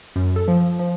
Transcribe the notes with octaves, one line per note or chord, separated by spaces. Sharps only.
F#2
A4
F3
F3